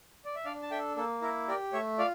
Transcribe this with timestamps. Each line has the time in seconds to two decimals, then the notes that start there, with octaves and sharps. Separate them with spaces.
0.25 D5
0.35 E5
0.45 D4 D5 F5
0.62 A5
0.71 A4 E5 G5
0.97 A#3 A4
1.22 E4 A#4
1.47 G4 A#4 D5
1.73 A3 C#5 E5
1.98 F4 D5 F5